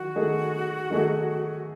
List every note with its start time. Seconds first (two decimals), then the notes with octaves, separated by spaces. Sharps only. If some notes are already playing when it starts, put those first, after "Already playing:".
Already playing: D#3 F#3 F#4
0.16 D#3 F#3 A3 D#4 G#4
0.90 D#3 F#3 A3 D#4 G#4